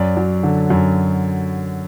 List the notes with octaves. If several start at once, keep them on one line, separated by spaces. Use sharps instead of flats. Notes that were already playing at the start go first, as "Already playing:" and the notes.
Already playing: F#2 D5
F#3
D3
F#2